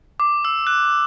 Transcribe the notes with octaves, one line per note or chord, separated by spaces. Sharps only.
D6
E6
F#6